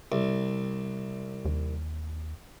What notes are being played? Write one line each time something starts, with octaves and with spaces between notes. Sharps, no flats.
C2
D#2